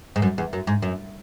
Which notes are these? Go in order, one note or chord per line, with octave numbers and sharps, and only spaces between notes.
G#2
F#2
E2
F#2
G#2
F#2